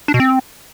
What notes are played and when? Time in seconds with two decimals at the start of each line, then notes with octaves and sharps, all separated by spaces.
0.08 D4
0.14 B2
0.20 C4